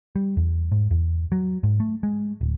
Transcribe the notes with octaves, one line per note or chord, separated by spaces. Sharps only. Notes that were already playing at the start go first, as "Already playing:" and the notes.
G3
E2
G#2
E2
F#3
G#2
A3
G#3
D1